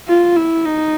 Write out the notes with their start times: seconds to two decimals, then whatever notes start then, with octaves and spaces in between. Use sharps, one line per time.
0.08 F4
0.36 E4
0.65 D#4